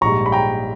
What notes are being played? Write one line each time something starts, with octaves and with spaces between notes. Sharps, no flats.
A#1 G#2 G3 A#5 C#6
B5
G5 A#5